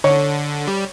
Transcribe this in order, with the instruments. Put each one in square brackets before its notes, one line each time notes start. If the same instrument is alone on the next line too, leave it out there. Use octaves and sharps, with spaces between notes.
[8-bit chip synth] D3 [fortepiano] C#5
[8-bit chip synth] G3